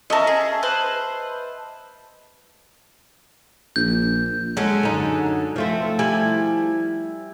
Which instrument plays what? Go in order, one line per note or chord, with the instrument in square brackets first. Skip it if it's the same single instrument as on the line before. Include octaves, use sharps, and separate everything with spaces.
[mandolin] C#4 A#4 [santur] D#5 E5 A5
[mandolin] G#4
B4 C5 F5
[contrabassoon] A#1 [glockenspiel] G6
[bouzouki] F#3 C#4 A4 [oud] G#3
[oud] F#2 D3 D#4
F3 A3 C4
[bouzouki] G3 E4 G#5